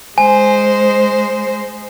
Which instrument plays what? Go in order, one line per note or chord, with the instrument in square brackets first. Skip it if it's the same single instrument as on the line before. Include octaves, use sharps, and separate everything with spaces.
[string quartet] G#3 C5 [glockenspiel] G#5